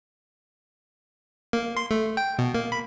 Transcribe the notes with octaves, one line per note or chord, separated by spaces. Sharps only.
A#3
C6
A3
G5
B2
A#3
B5